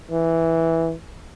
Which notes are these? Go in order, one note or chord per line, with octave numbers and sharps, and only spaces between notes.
E3